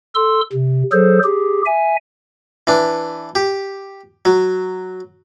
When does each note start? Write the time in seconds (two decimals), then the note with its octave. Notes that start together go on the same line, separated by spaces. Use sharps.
0.15 A4 C6 E6
0.52 C3
0.92 F#3 G#4 A4 C5
1.24 G4 G#4
1.66 E5 G#5
2.67 E3 D4
3.35 G4
4.25 F#3